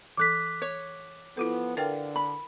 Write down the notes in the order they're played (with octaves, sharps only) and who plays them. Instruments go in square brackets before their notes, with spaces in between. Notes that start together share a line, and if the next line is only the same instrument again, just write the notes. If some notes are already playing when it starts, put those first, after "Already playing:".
[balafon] E3 A4 [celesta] D6 F#6 B6
[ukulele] C#5
[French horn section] F3 B3 [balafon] E4 F4 A4
[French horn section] D3 [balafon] A#4 B4 G5 [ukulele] F5
[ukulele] B5